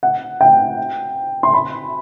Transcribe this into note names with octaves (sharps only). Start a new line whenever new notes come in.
F#5
G5
C6
B5